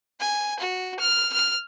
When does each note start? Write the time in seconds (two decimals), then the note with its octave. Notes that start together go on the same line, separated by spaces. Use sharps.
0.20 G#5
0.59 F#4
1.00 F6
1.33 F6